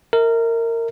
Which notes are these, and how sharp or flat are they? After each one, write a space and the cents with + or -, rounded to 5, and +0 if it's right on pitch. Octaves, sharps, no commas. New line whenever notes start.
A#4 -20 E5 -40